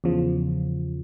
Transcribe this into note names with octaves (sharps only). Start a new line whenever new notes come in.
E2 C#3 F3